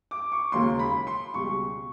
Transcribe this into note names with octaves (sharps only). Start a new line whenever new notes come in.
D6
C#6
E1 D#2 C#3 F#3 A#3 C6
B5
C6
C#2 B2 G3 C#6